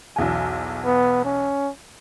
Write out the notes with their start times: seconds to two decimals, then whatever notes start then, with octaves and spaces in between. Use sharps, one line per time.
0.16 B1 E2 G#5
0.85 B3
1.24 C#4